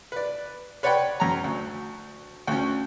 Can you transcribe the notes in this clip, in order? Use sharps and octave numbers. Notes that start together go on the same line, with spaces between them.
B4 D5
B4 C#5 D5 F#5 G5 B5
F#2 A#5
D2
D2 C#4